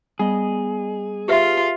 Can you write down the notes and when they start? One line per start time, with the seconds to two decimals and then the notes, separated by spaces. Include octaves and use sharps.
0.19 G3 B3 G#4 D#5
1.28 F4 G4 B4 E5